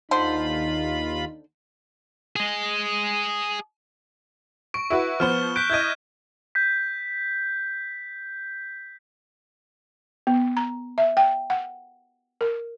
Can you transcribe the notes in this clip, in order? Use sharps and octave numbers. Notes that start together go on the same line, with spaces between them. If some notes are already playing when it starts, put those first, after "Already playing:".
D#2 D3 D#4 F4 C5 B5
G#4 D#5
C#6 D7
E4 F#4 B4
F3 B3 C5 F6 E7 G7
F#6 G6 B6 D7
E4 D#5 G6 G#6 D#7
G6 B6
B3
A#5
E5
G5
F#5
A#4